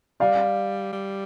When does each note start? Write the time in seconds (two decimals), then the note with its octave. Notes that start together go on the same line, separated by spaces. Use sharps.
0.20 G3 D5 F5
0.92 G3